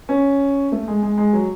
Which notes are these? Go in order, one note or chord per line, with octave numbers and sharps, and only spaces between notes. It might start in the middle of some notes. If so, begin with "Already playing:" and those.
C#4
A3
G#3
G#3
G#3
F#3